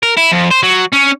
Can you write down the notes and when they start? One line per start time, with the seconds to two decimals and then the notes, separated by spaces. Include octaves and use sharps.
0.03 A#4
0.17 E4
0.32 F2
0.51 C5
0.63 F#3
0.93 C#4